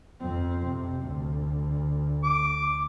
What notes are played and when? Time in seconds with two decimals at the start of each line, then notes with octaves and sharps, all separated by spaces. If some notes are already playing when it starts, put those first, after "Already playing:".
0.20 F2 C4
0.67 C3
1.03 D2
2.24 D6